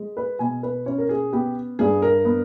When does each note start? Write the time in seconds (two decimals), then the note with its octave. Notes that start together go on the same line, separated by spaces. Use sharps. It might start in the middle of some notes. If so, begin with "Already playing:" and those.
Already playing: G#3
0.17 B4
0.39 B2 G#5
0.63 B4
0.86 C#4 C#5
0.98 A#4
1.09 G#4
1.33 B3 G4
1.79 G2 G#4
2.02 A#4
2.25 B3